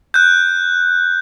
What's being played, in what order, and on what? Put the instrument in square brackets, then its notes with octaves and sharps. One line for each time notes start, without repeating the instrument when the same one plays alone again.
[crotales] F#6 G6